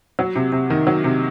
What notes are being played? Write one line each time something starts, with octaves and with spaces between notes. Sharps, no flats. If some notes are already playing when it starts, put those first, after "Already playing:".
F#3
C3
C3
D#3
F#3
C3